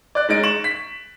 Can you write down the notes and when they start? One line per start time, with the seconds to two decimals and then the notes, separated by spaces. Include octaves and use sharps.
0.15 D5 F#6
0.29 G#3 C#4 D#4 A6 A#6 D7
0.43 C#6 E7 F#7
0.64 B6